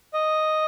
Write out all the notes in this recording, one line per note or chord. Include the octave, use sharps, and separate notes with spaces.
D#5